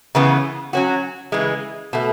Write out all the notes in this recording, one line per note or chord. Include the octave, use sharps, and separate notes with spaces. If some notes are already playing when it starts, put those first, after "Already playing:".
C#3 E3 B3
F#3 C#4 F#4
C#3 E3 G#3
B2 A3